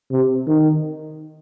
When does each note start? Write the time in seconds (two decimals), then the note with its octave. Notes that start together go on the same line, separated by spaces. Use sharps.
0.11 C3
0.47 D#3